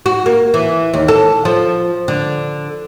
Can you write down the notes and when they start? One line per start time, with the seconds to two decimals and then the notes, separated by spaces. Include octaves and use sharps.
0.06 F#4
0.26 A#3
0.54 E3
0.93 D#2
1.08 A4
1.45 F3
2.08 D3